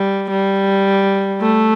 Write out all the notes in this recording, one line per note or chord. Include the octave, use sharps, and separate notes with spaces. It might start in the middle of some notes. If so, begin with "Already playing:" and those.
Already playing: G3
G3
A3